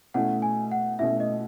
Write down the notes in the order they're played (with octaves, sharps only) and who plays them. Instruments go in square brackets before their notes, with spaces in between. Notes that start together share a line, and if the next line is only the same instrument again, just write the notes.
[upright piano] B2 A3 C#4 E4 [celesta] F#5
[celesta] G#5
F#5
[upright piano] B2 A3 C#4 E4 [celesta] E5
[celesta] D#5